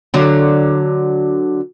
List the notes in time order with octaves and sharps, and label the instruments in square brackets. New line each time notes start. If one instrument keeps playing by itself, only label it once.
[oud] D3 F#3